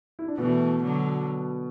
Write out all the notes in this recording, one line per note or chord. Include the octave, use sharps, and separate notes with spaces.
E4
D4
B2 E3 A3 B3
D3 F#3